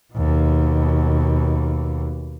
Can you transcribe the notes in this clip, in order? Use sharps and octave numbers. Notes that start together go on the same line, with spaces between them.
D#2 B2